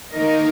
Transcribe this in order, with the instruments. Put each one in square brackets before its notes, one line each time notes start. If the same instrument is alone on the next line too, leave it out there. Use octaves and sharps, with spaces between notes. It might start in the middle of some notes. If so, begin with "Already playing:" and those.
[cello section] D#3 A#3 D#4 A#4 D#5